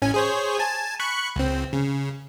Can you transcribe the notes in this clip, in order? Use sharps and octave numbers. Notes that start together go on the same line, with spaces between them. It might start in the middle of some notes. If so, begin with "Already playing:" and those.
A1 C#4 G#5
G#4 C5 C#5
G#5 A5
B5 C#6 F#6
C#2 C4
C#3